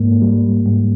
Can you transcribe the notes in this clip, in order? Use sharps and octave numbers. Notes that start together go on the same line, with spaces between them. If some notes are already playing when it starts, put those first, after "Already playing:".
Already playing: G#2 A#3
G3
G#2